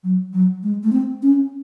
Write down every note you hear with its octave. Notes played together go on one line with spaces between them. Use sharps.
F#3
F#3
G#3
A3
C4
C#4